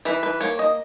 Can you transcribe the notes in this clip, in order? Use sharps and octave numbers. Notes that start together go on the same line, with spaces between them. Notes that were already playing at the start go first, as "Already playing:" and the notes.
E3 B4
B4
A#3 C#5
D#5